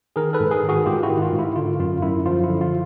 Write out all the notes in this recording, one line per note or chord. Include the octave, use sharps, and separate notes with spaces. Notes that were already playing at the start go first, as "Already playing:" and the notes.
D#3 G#4 A#4
A4 B4
G#2
G#4 A#4
D#3
F#4 G#4
G#2 F4 G4
E4 F#4
D#3
F4
G#2
E4
D3 F4
F#2 F4
F#2 E4
F3 F4
E4
D3
F4